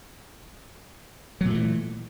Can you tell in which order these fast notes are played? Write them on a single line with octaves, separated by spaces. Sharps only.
F#3 A#2 A3 E3